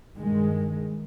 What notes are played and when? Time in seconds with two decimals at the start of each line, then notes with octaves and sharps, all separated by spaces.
0.16 G2 D#3 G#3